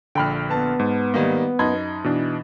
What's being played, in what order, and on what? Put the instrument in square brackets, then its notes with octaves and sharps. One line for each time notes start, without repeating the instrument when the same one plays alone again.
[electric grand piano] A#1 D3 [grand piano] G5 B5 F6
[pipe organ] B3 [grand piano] A5
[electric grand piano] G#2
[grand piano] D#3 G3 A#3
[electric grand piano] F#2 A5 C6 [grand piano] D#4 B5 G#6
[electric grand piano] B2 E3 D4